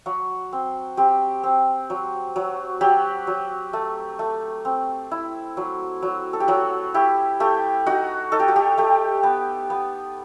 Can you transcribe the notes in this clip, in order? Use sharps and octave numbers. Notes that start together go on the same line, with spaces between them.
F#3 F#4
C4
C4 G4
C4
F#3
F#3
F#3 G4
F#3
A3
A3
C4
E4
F#3
F#3
A4
G4
F#3 F#4
E4 G4
A3 G4
D#4 F#4
D#4 A4
G4
F#4
G4
A3 G4
B3
B3